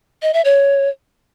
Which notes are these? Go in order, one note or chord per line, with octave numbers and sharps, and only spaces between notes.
D#5
E5
C#5